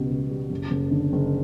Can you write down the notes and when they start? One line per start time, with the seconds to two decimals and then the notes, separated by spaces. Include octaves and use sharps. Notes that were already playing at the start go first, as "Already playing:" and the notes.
Already playing: C#2 B2 G3
0.10 C#2
0.31 G3
0.50 F#1
0.71 F#1
0.91 D3
1.13 F#1